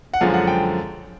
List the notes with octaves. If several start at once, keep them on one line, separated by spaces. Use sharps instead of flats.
F#5
F#2 D3 F3 G#3 F5
F#5
G5